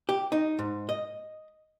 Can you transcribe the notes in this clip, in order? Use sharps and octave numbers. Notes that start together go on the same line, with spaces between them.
G4
D#4
G#2
D#5